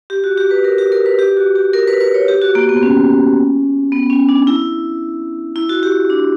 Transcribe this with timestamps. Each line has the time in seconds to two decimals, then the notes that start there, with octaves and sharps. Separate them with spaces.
0.10 G4
0.24 F#4
0.38 G4
0.51 B4
0.64 A#4
0.78 G4
0.92 A#4
1.06 B4
1.19 G4
1.37 F#4
1.55 G4
1.73 A#4
1.87 B4
2.00 B4
2.14 C#5
2.28 G4
2.42 F#4
2.55 A#3
2.69 B3
2.83 C#4
3.92 B3
4.10 C#4
4.29 D4
4.47 E4
5.56 E4
5.69 F#4
5.83 G4
6.10 D4